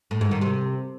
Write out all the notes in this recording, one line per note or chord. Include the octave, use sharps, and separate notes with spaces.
A2
G#2
D#3
C3